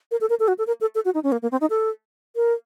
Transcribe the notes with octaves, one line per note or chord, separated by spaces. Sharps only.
A#4
A4
A#4
A4
F#4
A4
A#4
A4
A4
F#4
D#4
C#4
A#3
A#3
C4
D#4
A4
A#4